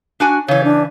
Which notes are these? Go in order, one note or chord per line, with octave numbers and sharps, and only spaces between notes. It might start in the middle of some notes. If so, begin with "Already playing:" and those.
D4 F#4 G#5
C#3 E3 C#5
D4